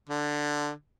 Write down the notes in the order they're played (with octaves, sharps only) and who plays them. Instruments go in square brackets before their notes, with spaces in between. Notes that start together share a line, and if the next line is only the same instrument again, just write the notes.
[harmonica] D3